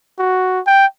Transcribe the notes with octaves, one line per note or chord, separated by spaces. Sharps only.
F#4
G5